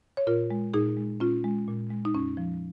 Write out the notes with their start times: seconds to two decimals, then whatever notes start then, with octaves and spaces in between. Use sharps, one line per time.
0.17 C#5
0.27 A#2 F4 A#4
0.51 G#3
0.74 A#2 D#4 G#4
0.97 G#3
1.20 A#2 C#4 F4
1.44 G#3
1.67 A#2
1.90 G#3
2.05 D#4
2.14 F2 C#4
2.37 F3